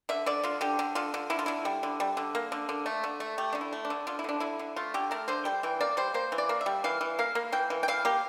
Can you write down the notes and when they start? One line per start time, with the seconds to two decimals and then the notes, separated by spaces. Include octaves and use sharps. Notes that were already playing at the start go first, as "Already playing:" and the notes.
0.09 D3 E5
0.26 D3 D5
0.43 D3 F4
0.61 D3 G4
0.79 D3
0.95 D3 F4
1.14 D3
1.30 D3 E4
1.39 F4
1.46 D3 E4
1.65 G3
1.83 D3
2.00 G3
2.17 D3
2.35 A#3
2.52 D3
2.69 D3
2.86 A3
3.04 D3
3.20 A3
3.38 A3 G4
3.53 D3 D4
3.61 E4
3.73 A3
3.85 D4
3.90 D3
4.07 D3 F4
4.19 E4
4.24 D3 D4
4.40 D3 E4
4.59 D3
4.76 A3 F4
4.94 D3 G4
5.11 A3 A#4
5.28 D3 C5
5.45 G3 G5
5.63 E3 G5
5.80 A#3 D5
5.97 G3 C5
6.14 A#3 C5
6.32 E3
6.38 D5
6.49 A#3
6.61 E5
6.66 G3
6.84 E3 F5
7.01 E3
7.19 A#3 F5
7.35 A#3
7.52 E3 G5
7.70 E3
7.83 G5
7.88 E3 F5
8.05 A#3 G4